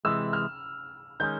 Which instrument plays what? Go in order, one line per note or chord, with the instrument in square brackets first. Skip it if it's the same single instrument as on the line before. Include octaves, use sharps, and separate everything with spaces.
[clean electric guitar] C3 E3 G#3 [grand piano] E6
[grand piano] F6
[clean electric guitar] D#3 G#3 C#4 [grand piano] G6